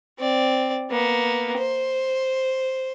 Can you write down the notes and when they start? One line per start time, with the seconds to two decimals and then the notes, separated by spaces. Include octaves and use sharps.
0.18 C4 D5
0.90 A#3 B3
1.58 C5